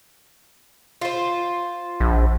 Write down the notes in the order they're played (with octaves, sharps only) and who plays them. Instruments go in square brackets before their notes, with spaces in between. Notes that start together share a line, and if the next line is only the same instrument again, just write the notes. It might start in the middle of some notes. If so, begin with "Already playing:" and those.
[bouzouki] F4 C5
[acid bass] A#1